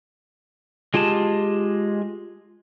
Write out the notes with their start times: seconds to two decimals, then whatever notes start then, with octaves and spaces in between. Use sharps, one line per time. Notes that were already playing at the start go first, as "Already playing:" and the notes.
0.94 G#3 F4 G4 G#4 A5